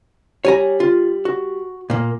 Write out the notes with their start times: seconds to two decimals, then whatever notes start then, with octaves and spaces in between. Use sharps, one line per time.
0.45 G3 C#5 G#5 A#5
0.80 F4
1.25 F#4
1.90 A#2 A#3